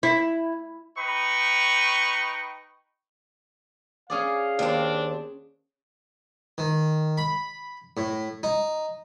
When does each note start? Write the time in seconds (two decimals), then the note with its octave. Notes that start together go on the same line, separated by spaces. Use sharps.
0.03 E4
0.98 D#4 B4 G5 C#6
4.10 C#4 G#4 D5 F5
4.59 D#2 C4 D4
6.58 D#3
7.18 B5
7.97 A2
8.43 D#4